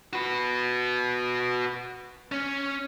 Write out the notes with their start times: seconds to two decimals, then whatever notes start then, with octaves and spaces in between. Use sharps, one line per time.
0.13 F#4 B4
2.32 C#4